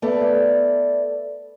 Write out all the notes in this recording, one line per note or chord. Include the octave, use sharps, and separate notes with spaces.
A3 B3 A4 D5